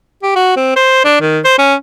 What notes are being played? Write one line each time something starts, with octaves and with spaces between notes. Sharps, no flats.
G4
F#4
C4
C5
D4
D#3
C5
C#4